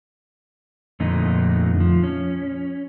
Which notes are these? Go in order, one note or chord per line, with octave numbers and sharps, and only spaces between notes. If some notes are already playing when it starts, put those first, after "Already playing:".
F2 A#2 D3 A3 D#4
F3
C#4